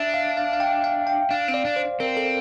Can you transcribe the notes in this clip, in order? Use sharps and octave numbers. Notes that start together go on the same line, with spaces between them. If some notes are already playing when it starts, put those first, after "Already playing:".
Already playing: D4 E5
F5
F5
F5
G5
F5
G5
D4 F5
C4
D5
D4
C5
C4 A#4
A4